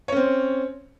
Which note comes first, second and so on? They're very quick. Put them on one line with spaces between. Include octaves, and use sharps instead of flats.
C#5 C#4 C4